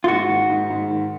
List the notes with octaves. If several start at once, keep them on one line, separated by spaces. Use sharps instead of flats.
F4
G#2 F#4
D#3
G#2
G#2
D#3